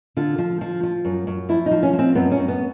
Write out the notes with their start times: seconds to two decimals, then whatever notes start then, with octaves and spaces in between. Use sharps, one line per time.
0.17 D3 F4
0.38 F3
0.61 F3
0.83 F3
1.05 F#2
1.27 F#2
1.49 F3 E4
1.66 D#4
1.71 F3
1.83 C#4
1.93 F3
1.99 C4
2.15 F#2 B3
2.32 C#4
2.37 F#2
2.48 B3